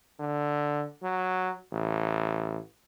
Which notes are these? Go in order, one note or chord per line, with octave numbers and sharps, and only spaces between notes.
D3
F#3
A1